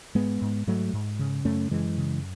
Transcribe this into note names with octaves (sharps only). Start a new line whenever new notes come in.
G#2 G#3 B3
G#2
G#2 F#3 A3
G#2
C#3
F#2 A3 C#4
F#2 E3 G#3
C#3